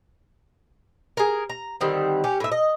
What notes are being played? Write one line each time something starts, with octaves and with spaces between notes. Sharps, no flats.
G#4 A#4
A#5
D3 D#3 G3 C4
C#4 G4
A2 E5
D#5